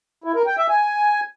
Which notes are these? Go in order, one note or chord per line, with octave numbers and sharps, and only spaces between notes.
E4
A#4
G5
E5
G#5